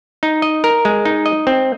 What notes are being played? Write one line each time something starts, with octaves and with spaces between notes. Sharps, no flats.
D#4
D#5
A#4
G#3
D#4
D#5
C4